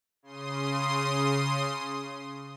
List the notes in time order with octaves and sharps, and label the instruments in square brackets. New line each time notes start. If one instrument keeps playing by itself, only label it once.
[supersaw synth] C#3 C6 D#6